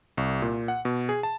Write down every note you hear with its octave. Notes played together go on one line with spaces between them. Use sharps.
C2
A#2
F#5
B2
G#4
A5